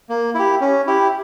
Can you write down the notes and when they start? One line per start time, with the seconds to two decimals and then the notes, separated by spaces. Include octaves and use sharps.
0.09 A#3
0.35 E4 G4
0.61 C#4
0.87 E4 G4